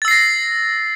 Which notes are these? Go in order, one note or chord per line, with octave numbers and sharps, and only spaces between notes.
E6 A6 A#6 C7